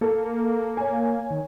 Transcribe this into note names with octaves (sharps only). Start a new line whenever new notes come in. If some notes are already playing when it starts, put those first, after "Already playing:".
A#3 A4
C#5 G#5
D#3